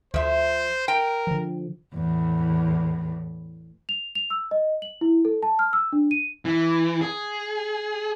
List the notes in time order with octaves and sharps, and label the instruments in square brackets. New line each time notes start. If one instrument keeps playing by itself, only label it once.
[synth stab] D2 [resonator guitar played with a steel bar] F3 E5 [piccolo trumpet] C5
[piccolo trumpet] A#4 [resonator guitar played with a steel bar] G5
[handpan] D3 F3
[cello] E2 A2
[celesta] F7
F7
E6
D#5
F#7
E4
A4
A5
F6
E6
D4
D#7
[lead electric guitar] E3
G#4